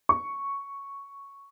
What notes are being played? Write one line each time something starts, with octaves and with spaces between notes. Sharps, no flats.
C#6